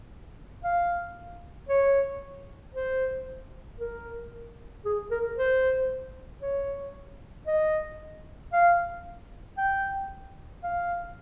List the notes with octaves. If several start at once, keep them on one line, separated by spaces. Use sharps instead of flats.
F5
C#5
C5
A#4
G#4
A#4
C5
C#5
D#5
F5
G5
F5